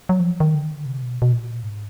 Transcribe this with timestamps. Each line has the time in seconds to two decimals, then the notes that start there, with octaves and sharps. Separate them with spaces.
0.09 F#3
0.20 F3
0.40 D#3
0.55 D3
0.63 D#3
0.71 D3
0.86 C3
1.02 B2
1.22 B2
1.32 A#2
1.63 G#2